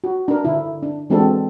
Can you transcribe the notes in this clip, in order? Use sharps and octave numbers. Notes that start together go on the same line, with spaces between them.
F#4
D4 A#4
D3 E4
D4
E3 G#3 C4 D4 F#4 A4